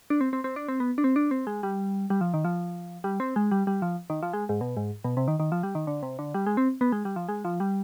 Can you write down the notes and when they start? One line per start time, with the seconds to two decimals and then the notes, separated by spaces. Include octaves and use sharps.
0.10 D4
0.21 C4
0.33 C4
0.44 C4
0.56 D4
0.68 C4
0.80 B3
0.98 D4
1.04 C4
1.16 D4
1.31 C4
1.47 G#3
1.63 G3
2.10 G3
2.21 F3
2.34 D#3
2.45 F3
3.04 G3
3.20 C4
3.36 G#3
3.51 G3
3.67 G3
3.82 F3
4.10 D#3
4.23 F3
4.33 G#3
4.49 G#2
4.61 B2
4.77 G#2
5.04 B2
5.17 C3
5.28 D#3
5.40 D#3
5.52 F3
5.63 G3
5.75 D#3
5.87 D3
6.03 C3
6.19 D3
6.34 G3
6.46 G#3
6.57 C4
6.81 B3
6.92 G#3
7.05 G3
7.16 F3
7.28 G#3
7.45 F3
7.60 G3